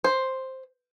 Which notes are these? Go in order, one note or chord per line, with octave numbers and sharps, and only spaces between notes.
C5